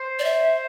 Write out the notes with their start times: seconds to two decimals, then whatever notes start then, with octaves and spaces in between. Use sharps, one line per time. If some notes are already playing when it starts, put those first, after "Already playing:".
Already playing: C5
0.19 D5
0.24 E5